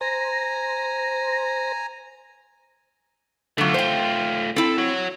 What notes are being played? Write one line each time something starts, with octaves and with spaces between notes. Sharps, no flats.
C5 G#5 A#5 A#6
D3 F#3 A3 F4
C5 G5
C4 E4 A4
F#4 C#5